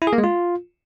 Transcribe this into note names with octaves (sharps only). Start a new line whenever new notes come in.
E4
G#4
A#3
G#3
F4